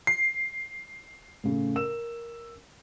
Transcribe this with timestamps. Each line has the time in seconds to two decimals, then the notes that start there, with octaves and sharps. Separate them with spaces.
0.07 C7
1.44 A2 C#3
1.76 A#4 E6 E7